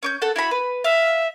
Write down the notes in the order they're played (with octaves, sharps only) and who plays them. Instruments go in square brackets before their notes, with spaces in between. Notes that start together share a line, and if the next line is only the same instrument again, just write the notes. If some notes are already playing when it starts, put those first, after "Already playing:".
[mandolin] C#4 D6 G6
A4 F#5
E4 F#4 B5
B4
[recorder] E5 [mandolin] F5